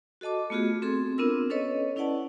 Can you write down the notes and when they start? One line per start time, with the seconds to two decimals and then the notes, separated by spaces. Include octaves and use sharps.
0.21 F#4 A4 D#5 A5 D6
0.50 A3 B3 F4 F#4 G#4
0.82 C4 G#4 A4 C6
1.18 B3 C4 D4 F4 A#4 E6
1.50 C#4 A4 B4 C#5 D#5
1.96 C#4 E4 B4 D5 F#5 A5